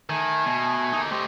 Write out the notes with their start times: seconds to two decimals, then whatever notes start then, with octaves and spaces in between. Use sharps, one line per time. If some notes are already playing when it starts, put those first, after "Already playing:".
0.09 D#3 A3 G#5
0.46 B2
0.92 A#3 D#4
1.11 A3 G4 C5 D#5